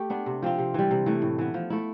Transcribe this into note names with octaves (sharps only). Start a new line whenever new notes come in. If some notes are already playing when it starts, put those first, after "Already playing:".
Already playing: A3 G4
B3 D4
C3
F3 C4 F4
C3
E3 G3
C3
E3 A3
A2
E3 B3
F3
A3 E4